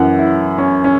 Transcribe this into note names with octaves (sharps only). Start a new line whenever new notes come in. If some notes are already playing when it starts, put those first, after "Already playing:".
Already playing: F#2 E3 F#5
E4
C#4
C#4